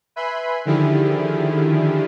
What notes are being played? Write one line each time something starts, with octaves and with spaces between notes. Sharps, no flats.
B4 E5 G#5 B5 C6
D3 D#3 F3 E4 G4 G#4